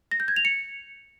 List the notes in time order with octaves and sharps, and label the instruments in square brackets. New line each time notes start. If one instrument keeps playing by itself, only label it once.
[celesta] A#6
G6
G#6
F7
C#7